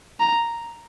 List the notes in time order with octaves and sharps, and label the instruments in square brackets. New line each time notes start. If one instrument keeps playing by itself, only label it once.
[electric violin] A#5